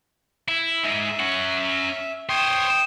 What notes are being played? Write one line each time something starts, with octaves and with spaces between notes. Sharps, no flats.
E4
G#2 G#3 E5
C#4 F#5
C5 C#5 G5 D#6